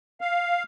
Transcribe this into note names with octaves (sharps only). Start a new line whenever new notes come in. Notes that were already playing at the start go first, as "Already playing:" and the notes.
F5